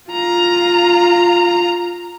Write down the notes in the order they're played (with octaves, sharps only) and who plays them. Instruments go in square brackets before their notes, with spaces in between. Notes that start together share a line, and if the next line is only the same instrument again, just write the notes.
[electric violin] F4 A#5